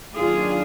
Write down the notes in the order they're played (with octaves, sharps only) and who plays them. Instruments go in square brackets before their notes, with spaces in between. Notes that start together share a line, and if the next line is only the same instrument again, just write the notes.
[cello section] D#3 F#3 A#3 D4 F4 G#4